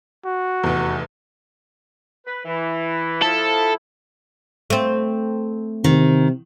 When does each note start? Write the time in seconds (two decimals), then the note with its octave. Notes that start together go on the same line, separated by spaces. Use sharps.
0.25 F#4
0.63 F1 E2
2.26 B4
2.45 E3
3.22 F3 E4 A4
4.70 A3 C4
5.84 C3 D#3